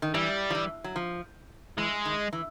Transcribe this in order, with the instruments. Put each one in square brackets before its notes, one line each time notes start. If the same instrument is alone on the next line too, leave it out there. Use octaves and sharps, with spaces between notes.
[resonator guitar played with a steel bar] D#3
[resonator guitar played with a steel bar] E3 [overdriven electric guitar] G3
[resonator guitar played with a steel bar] F3
E3
F#3
F3
[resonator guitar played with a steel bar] E3 [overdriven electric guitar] G#3
[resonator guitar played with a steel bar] D#3
E3